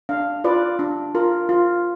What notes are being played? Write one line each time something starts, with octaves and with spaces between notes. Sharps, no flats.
D4 F5
F4 B4 D5
D4
F4 A#4
F4